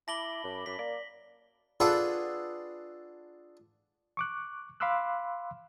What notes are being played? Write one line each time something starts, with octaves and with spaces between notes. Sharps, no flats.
E4 A5 B5 D6 A#6 F#7 G7
F#2
F#2 B6
A#3 D5
D4 F4 G#4 A4 B4 F#5
C#6 D6 F#6
F5 B5 C6 D6 E6 F#6